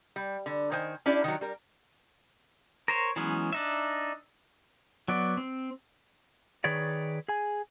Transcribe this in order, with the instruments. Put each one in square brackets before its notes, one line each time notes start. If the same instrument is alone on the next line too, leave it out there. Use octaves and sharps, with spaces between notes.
[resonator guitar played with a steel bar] G3
D3
D#3 C5 G#5
C#4 D4 E4 G4 D5
D#3 F#3
G3 A#4
[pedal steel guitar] A#4 C5 C#5
E3 F#3 G#3 B3 C#4
D4 D#4 E5
F#3 B3 D5
C4
[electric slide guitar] D#3 G#4 B4 C#5 D5
G#4 G#5